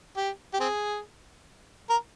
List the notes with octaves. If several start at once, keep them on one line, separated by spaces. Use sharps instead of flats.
G4
G4
C4 G#4
A#4